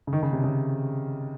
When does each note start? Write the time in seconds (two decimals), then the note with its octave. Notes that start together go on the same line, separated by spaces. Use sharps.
0.07 C#3
0.13 D#3
0.22 C#3
0.33 C3
0.44 C#3